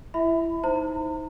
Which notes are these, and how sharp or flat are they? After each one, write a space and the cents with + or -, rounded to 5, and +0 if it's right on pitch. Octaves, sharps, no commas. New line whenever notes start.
E4 +25 E5 -15 B5 +25
D#4 +20 C5 +0 A#5 -40